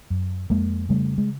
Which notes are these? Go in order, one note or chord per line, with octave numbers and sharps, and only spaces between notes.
F#2
F2 G#3 A#3
C#3 G3 A3
G#3